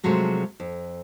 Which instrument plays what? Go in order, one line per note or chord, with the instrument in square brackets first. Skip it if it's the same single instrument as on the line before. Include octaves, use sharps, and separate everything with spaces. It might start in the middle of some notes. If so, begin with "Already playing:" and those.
[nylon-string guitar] C3 F3 F#3 G#3 A3
F2